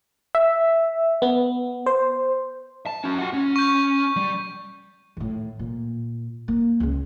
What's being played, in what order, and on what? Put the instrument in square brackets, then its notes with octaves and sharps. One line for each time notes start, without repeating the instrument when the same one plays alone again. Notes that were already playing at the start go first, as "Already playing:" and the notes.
[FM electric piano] E5
B3
C5
[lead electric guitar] A5
C#4 F#4
F4 F#5
C#4
[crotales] C#6 G6
[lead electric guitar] G3
[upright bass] A2 D#3
A#2
A#3
C#2 C#3